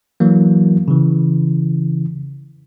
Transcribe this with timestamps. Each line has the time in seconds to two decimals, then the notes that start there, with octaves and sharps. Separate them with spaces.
0.20 E3 F#3 A#3
0.88 C#3 E3